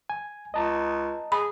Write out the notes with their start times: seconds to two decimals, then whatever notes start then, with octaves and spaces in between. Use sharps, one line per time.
0.10 G#5
0.54 C#2 D#5 A5 A#5
1.32 G#4 B5